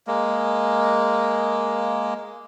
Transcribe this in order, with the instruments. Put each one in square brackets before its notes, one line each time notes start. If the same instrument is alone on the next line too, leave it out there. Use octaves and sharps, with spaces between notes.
[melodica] G#3 A#3